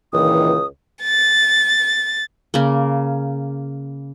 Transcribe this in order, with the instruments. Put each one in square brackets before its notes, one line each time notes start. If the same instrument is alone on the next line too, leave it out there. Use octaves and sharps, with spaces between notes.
[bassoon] C#2 [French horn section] A#2 D#3 E3 [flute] D#6
[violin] A6
[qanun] C#3 A#3